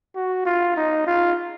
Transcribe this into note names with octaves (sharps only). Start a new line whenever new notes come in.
F#4
F4
D#4
F4